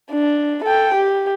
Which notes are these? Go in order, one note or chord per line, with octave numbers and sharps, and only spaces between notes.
D4
A4 G5
G4